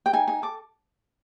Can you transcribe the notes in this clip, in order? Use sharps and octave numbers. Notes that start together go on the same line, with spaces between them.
G5
D#4 G#5
D#4 G#5
A4 D6